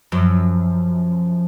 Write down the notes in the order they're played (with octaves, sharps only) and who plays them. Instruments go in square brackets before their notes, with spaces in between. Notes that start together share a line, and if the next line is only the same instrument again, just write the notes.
[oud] F#2 [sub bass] F3